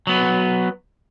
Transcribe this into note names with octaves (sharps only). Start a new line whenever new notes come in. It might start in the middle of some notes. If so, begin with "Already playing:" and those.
F#3 B3